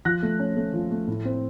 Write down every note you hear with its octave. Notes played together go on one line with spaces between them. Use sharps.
F3 F#6 A#6
A3
C#4
A3
F3
A3
A2
C4